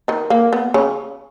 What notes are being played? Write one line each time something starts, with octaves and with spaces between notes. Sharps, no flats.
D#3 D#4
A#3
B3
C#3 C#4